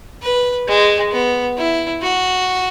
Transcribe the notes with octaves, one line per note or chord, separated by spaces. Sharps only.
B4
G#3
B3
E4
F#4